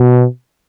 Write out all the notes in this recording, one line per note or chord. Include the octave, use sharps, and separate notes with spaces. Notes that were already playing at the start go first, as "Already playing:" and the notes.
Already playing: B2